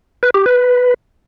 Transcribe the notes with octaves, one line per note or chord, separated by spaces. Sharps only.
B4
G4
B4